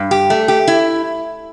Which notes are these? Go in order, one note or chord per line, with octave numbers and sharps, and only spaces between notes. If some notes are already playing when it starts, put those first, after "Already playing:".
Already playing: G2
G4
A3
G4
E4